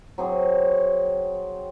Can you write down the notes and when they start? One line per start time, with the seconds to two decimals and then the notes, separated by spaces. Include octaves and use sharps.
0.18 F#3 C4 G#4 D6